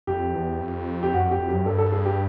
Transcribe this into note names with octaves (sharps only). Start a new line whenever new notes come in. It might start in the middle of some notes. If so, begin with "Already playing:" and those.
F2 G4
E2
F2
G4
F#2 F#4
F2
G4
F2
F#2 G4
G2 A4
A4
G#4
G4